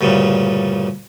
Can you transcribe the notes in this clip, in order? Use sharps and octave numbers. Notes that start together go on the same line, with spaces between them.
D2 G2 A#2 C#3